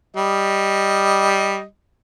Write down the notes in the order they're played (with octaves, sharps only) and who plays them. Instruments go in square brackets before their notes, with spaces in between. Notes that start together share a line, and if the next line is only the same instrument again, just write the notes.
[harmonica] G3 D#5